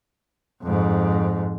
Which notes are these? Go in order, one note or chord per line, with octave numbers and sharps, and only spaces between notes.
F2 G#2